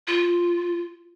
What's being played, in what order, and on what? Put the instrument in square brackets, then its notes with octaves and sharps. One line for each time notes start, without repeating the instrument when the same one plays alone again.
[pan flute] F4